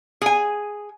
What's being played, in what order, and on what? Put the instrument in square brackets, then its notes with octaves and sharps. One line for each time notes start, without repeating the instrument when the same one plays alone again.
[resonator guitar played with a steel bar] G#4 G#5